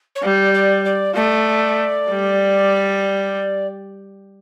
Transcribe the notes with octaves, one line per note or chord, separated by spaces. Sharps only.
C#5
G3 D5
D5
D5
A3 D5
G3